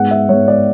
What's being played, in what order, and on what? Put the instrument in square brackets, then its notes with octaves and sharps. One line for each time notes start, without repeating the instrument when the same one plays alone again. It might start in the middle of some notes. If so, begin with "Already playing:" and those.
Already playing: [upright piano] G#2 G#3 B3 F#5
E5
G#2 G#3 B3 C#5
D5